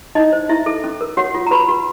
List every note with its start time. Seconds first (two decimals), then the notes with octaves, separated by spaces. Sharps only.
0.15 D#4 E4 D#5
0.32 C5
0.49 E4 E5
0.66 A4
0.84 C#4
1.01 A#4
1.17 F#4 C#5 F#5
1.35 F4
1.46 A#5
1.51 F#4 B4 B5
1.69 F#4